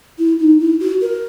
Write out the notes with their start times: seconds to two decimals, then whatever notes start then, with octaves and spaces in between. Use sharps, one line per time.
0.18 E4
0.39 D#4
0.60 E4
0.80 F#4
1.01 A#4